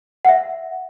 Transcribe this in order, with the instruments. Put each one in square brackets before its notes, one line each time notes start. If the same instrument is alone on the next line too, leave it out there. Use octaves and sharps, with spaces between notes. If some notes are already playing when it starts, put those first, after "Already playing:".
[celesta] E5 F#5